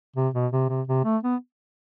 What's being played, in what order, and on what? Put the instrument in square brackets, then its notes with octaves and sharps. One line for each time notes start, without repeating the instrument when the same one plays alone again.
[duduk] C3
B2
C3
C3
C3
A3
B3